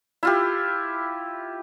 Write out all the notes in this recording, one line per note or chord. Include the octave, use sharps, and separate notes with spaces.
E4 F4 G4